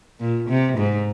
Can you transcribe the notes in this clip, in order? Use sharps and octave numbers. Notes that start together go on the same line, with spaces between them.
A#2
C3
G#2